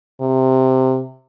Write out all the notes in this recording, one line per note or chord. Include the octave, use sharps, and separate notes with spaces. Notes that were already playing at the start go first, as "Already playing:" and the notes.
C3